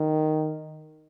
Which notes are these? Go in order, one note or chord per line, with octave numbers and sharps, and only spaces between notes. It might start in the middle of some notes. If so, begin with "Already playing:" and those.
Already playing: D#3